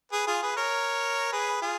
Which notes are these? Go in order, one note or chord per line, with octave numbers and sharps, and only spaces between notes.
G#4 B4
F4 G#4
G#4 B4
A#4 C#5
G#4 B4
F4 G#4